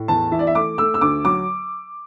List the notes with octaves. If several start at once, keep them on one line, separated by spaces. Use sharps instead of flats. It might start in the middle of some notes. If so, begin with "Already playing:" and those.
Already playing: A2
E2 A5
E3 E5
D5
E5
A3 D6
A3 E6
E6
D2 D6
F#3 D6